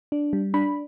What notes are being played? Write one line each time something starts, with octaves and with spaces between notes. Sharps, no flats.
D4
G3
D4 B5